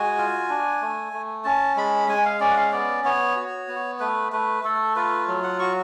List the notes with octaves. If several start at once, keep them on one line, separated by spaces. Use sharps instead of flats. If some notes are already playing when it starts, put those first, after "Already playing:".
Already playing: G#3 F#4 G#5
F4
D4
A3
A3
C#4 A5
G#3 B5
G#3 G#5
F5
C#4 D5
F#5
F5
B3 D5
B3 C#5
F#4
B3
A3 B4
A3 B4
A3 A4
F4 B4
F#3
F#5
F#4 C#6